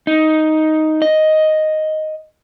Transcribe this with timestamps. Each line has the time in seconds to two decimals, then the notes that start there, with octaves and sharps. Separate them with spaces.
0.07 D#4
1.02 D#5